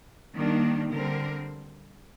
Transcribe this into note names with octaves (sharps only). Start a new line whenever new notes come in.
D#3 G3 A#3 D4
D3 G3 C4 A#4